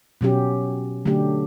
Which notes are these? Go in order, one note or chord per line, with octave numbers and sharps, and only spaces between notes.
B2 F#3 C#4 G4
D3 F#3 A3 D4 G4